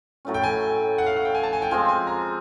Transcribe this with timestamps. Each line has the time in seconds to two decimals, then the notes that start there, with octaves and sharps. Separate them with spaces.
0.25 A2 F#3 A3 C#4
0.34 G5
0.44 G#5
0.98 F#5
1.06 F5
1.16 F#5
1.25 G5
1.35 G#5
1.43 A5
1.53 G#5
1.62 G5
1.71 F3 G#3 C4 G#5
1.89 G#5
2.07 A#5